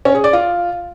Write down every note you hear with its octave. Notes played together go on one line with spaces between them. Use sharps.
C#4
G#4
D5
F4